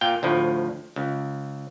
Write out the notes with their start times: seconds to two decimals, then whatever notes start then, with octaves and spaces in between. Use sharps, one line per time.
0.01 A#2 F5 G5
0.23 D2 A2 F3
0.96 C#2